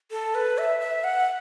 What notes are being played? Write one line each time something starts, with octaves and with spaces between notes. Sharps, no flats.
A4
B4
E5
E5
F#5